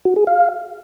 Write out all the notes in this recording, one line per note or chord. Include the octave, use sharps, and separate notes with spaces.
F#4
G#4
F5